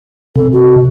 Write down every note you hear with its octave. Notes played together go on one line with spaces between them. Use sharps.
C3 A4
F#4